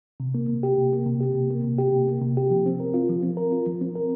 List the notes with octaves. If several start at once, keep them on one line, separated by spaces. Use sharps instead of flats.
C3
A#3
C3
G4
C3
A#3
C3
G4
C3
A#3
C3
G4
C3
A#3
C3
G4
F3
C4
A#4
F4
F3
C4
A#4
F4
F3
C4
A#4